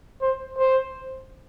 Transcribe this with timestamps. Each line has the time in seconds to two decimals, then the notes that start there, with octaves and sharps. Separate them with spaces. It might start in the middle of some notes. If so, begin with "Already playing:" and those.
0.22 C5
0.58 C5